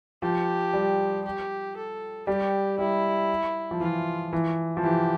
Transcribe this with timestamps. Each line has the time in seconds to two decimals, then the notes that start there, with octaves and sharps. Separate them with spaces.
0.22 F3 G4
0.74 G3
1.25 G4
1.77 A4
2.27 G3 G4
2.79 G3 E4
3.71 F3
3.80 E3 F4
4.33 E3
4.77 F3
4.83 E3 G4